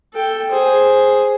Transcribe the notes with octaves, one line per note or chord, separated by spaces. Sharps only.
A4 G5
G#4 C5